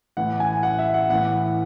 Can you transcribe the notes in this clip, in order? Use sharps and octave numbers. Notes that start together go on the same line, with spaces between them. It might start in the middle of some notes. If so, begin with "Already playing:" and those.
A2 E3 F#5
G#5
F#5
E5
F#5
A2 E3 F#5